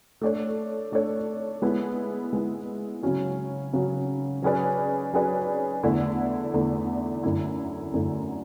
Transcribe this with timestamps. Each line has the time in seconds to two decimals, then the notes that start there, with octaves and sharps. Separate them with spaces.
0.21 A3 D4 A4 C#5
0.92 A3 D4 A4 C#5
1.62 G#3 B3 E4
2.33 G#3 B3 E4
3.03 C#3 F#3 C#4 F#4
3.73 C#3 F#3 C#4 F#4
4.42 F#3 C#4 G#4 B4 D5
5.13 F#3 C#4 G#4 B4 D5
5.83 E2 D3 A3 E4
6.54 E2 D3 A3 E4
7.24 F#2 D3 A3 E4
7.94 F#2 D3 A3 E4